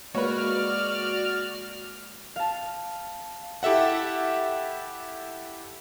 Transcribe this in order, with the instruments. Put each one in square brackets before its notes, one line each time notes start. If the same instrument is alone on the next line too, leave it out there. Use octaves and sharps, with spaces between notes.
[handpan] G#3 A#3 [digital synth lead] F#4 [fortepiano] B4 C#5 [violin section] D5 F6
[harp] F5 A5
[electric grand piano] E4 G4 A4 E5 F#5